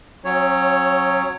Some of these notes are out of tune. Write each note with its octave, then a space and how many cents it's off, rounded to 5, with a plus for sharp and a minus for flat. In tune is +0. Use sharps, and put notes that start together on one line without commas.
F#3 -15 C#4 -45 C#5 +0